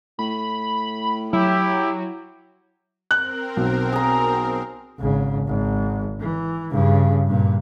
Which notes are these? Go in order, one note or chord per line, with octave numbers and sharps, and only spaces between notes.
A2 B5
F#3 E4 G4
C4 A#4 F#6
B1
G#4 A#5
G#1 C#3
G#1
E3
G2 C#3
G2 A#2